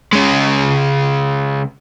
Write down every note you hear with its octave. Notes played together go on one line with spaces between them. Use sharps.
C#3 G#3